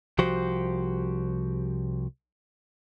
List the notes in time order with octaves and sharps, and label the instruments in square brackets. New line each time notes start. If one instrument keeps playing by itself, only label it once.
[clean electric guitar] C2 F3 F#4 G4 C5